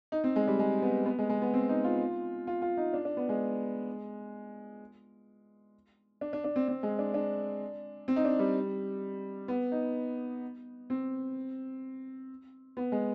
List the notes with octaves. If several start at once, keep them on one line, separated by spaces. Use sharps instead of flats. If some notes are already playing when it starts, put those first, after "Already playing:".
D#4
C4
G#3
G3
G#3
B3
B3
G#3
G#3
B3
C4
D#4
F4
F4
F4
D#4
D4
D4
B3
G#3
D4
D4
D4
C4
C4
G#3
D4
D4
C4
D#4
D4
G3
B3
D#4
C4
B3
G#3